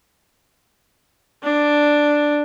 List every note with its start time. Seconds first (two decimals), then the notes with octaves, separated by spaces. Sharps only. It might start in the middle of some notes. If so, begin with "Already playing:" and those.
1.43 D4